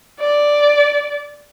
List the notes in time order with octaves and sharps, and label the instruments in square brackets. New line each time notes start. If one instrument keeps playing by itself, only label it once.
[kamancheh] D5